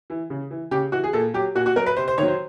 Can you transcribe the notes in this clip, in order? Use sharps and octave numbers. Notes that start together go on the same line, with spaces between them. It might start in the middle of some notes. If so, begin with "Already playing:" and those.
E3
C#3
E3
C#3 G4
E3 F#4
G#4
A#2 A4
F#3 G4
A#2 F#4
F#4
F#3 A#4
B4
C3 C5
C5
D#3 F#3 C#5
C5